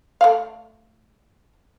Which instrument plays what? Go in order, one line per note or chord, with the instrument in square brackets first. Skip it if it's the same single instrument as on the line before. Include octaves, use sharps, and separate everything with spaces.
[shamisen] A3 D5 F5